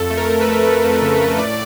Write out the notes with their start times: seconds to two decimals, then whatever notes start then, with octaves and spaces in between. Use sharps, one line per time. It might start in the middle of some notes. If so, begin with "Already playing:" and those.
Already playing: F2 A4
0.10 A3
0.17 A#4
0.29 A3
0.41 B4
0.47 A3
0.66 A3
0.84 F2
1.02 C#3
1.21 F2
1.38 A2 D5